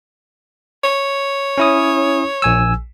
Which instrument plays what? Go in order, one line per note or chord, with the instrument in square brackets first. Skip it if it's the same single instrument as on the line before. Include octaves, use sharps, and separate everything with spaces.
[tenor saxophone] C#5
[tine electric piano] C#4 E4 D#6
A#1 G#5 E6